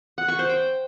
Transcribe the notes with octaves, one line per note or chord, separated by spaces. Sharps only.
F#5
C#6
C5
G5